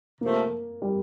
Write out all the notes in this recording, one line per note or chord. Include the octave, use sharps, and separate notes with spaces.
C3 F3 A3 A#3
G3